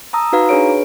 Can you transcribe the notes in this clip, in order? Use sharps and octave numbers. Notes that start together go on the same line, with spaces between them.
A5 A#5 D#6 E6
D#4 F#4 B4 F5 A#5
D4 G#4 B4 C#5 D7
G#4